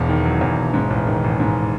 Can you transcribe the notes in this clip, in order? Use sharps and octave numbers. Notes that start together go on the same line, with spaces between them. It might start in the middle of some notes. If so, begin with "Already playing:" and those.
Already playing: E1 E2
D#3
F#3
E2
E1
G#2
A1
D#3
A1
G#2